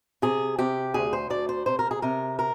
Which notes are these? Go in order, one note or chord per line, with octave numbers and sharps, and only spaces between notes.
C3 G#4
C3 G4
D2 G#4
C5
D2 D5
C5
C3 C5
A#4
G#4
C3 A#4
A#4